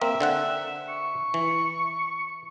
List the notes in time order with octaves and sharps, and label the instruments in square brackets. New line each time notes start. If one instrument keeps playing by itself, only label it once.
[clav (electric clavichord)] A#3 C4 A#4 [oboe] E5
[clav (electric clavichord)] D3 C4 F#5
[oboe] C#6
[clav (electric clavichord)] E3